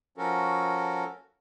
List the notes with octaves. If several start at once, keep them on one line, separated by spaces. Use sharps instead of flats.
F3 C#4 F#4 A4 A#4